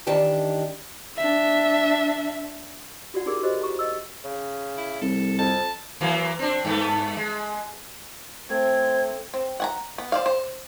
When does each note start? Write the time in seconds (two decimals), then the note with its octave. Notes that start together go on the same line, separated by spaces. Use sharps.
0.07 D#3 E3 D4 G4 A5
1.17 D4 E5
3.14 F4 F#4 D5 F#5
3.26 D#4 E4 G4 G#4 A#4 D5
3.43 E4 F#4 G4 B4 C5 D#5
3.62 A#5 C#6
3.79 D#5 E6
4.25 C#3
4.77 E4
5.01 C2 A4
5.39 F2 A5
6.01 E3 F#3 A#3
6.39 C4 D4
6.65 G2 A3 B3
7.17 G#3
8.50 A3 C4 C5 G#6
9.34 C4
9.60 F#5 G#5 A#5
9.98 B3
10.12 C5 D5 F5
10.26 C5